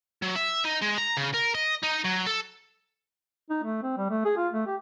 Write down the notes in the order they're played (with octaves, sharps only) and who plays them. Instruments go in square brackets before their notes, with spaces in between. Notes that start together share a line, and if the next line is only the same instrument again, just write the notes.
[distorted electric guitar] F#3
E5
D#4
G#3
A#5
C#3
A#4
D#5
D#4
F#3
A4
[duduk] D#4
A3
C4
G3
A3
G#4
F4
A3
G4